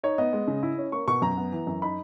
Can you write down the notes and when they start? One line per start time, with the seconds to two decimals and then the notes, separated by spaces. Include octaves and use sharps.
0.03 D#4 C#5
0.18 B3 D#5
0.33 G#3
0.48 C#3
0.63 E4
0.78 C#4
0.92 A#3 C#6
1.08 B2 C#6
1.22 F#2 A#5
1.37 B3
1.52 E3
1.67 F#2
1.82 D#4 B5